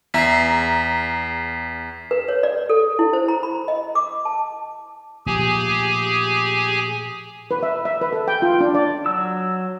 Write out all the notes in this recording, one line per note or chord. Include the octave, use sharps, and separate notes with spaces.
E2 E5 A#5 B6 C7
B4
C#5
D5
A4
E4
C5
A#5
B5
D#5
D6
A5
A#2 F3 A3 G4 G#4 G#5
B4
E5
E5
B4
A4
G5
F4
D4
D5
F#3 E6